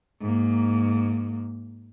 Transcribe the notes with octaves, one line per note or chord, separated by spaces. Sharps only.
G#2 A#3